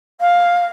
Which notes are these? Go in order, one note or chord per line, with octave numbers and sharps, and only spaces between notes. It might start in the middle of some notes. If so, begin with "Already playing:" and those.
F5